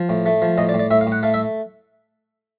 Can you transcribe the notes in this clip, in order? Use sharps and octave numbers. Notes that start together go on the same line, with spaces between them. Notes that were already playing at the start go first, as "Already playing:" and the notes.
Already playing: F3
A2
A3
F3
A2 D#5
D5
A2
D5
A2 E5
F5
A2
F#5
A3 F5
E5